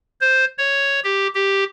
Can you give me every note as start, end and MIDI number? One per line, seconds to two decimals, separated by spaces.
0.21 0.45 72
0.58 1.00 73
1.04 1.27 67
1.35 1.64 67